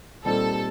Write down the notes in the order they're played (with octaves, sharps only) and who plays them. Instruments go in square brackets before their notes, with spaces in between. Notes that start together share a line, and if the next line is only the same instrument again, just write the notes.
[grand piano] A#2 G3 C4 D#4 [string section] A4